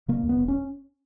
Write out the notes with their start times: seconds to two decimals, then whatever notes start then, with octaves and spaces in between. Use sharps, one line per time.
0.08 C#3 A#3
0.23 D#2
0.29 B3
0.39 E1
0.48 C#4